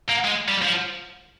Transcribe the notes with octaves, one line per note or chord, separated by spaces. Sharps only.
A#3
G#3
G3
F3